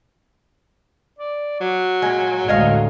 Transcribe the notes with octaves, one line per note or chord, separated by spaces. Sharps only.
D5
F#3
A#2 G#3
A1 D2 G#3 C#5 D#5 F5